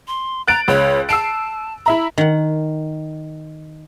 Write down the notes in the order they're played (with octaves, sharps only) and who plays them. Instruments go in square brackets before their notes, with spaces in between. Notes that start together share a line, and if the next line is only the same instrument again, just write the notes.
[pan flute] C6
[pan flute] A#5 [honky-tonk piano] F#6 A6 D7
[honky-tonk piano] C#2 [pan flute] C#5
[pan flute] A5 [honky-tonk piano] E6 C7 D7
[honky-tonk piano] E4 E5 A#5 [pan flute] B5
[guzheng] D#3 F#5